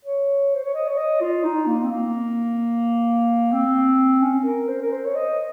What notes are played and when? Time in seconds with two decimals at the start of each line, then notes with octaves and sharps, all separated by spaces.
0.05 C#5
0.54 C5
0.64 C#5
0.74 D#5
0.88 C#5
0.97 D#5
1.21 F4
1.44 D#4
1.67 A#3
1.84 C4
1.91 A#3
3.52 C4
4.21 C#4
4.45 A#4
4.68 C5
4.82 A#4
4.92 C5
5.05 C#5
5.15 D#5